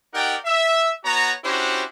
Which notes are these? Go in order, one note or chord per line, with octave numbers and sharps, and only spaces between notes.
D#4 G4 A#4 D5 F#5 G5
E5
B3 F#4 C#5 A#5
C#4 D4 E4 F#4 G4 C5